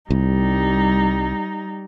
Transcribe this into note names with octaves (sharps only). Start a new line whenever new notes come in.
C2 G3 D#4